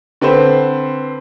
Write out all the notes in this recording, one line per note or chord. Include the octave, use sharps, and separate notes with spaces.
D3 C4 B4 C5